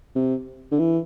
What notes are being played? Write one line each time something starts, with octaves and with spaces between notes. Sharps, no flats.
C3
D3
E3